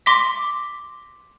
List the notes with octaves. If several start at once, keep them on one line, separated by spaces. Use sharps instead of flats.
C6 D6 A#6 B6